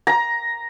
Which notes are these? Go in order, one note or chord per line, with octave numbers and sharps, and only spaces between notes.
A#5